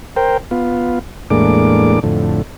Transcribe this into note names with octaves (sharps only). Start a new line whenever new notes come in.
A#4 C5 G5
B3 F4
E2 A2 G#3 A#3 D4 D6
F2 A2 D3